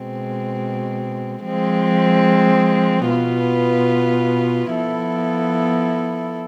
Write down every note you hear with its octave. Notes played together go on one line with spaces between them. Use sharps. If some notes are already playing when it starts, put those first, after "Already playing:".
Already playing: B2 G#3 C4
F3 G#3 C4
B2 B3 F4 B4
F3 B3 E4 A4